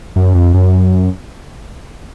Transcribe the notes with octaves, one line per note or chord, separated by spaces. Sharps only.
F#2
F2
F#2